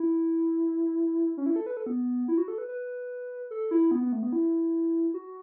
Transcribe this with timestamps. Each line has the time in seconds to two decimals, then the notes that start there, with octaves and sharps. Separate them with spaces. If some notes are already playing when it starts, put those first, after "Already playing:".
Already playing: E4
1.37 C#4
1.46 E4
1.56 A4
1.66 B4
1.77 A4
1.86 B3
2.28 E4
2.38 F#4
2.48 A4
2.58 B4
2.68 B4
3.51 A4
3.71 E4
3.91 B3
4.02 B3
4.12 A3
4.23 B3
4.32 E4
5.14 F#4